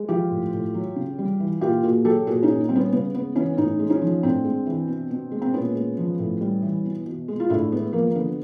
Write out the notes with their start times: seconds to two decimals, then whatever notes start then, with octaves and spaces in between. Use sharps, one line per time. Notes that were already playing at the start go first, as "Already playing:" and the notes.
Already playing: G#3
0.09 F3 F4 G4
0.31 A2
0.53 A2
0.74 F#3
0.96 C#3
1.18 G3
1.40 E3
1.61 A#2 F4 G4
1.83 A#2 F#4 G#4
2.05 F#3 G4 A4
2.27 A#2 F#4 G#4
2.43 C#4 D#4
2.49 A#2
2.69 G3 C4
2.76 B3 C#4
2.92 C#3 B3
3.14 G#3 B3
3.35 E3 B3 C#4
3.57 A2 C#4 D#4
3.79 G#3
3.90 C#4 D#4
4.02 F3
4.23 A2 C4 D4
4.44 G#3
4.67 E3
4.88 B2
5.11 B2
5.31 G#3
5.42 C4
5.53 A#2 B3 C#4
5.75 G#3
5.98 F3
6.19 A2
6.41 G3
6.62 E3
6.85 B2
7.06 B2
7.28 G#3
7.40 F4
7.49 A2 D4 E4
7.72 G#3 B3
7.93 F3 A#3
8.10 A#3
8.15 D3 B3